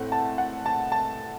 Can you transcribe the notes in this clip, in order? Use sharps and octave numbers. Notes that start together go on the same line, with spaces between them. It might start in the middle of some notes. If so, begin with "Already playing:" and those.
Already playing: A2 A3 C4 F#5
A5
F#5
A5
A5